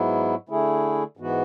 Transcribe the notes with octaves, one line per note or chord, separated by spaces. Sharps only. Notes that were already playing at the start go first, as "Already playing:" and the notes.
Already playing: G#2 F#3 B3 E4
D3 A3 E4 G#4
G#2 E3 B3 F#4